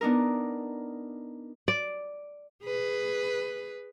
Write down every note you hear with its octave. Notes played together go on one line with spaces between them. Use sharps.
B3 D4 D#4 A#4
D5
G#4 B4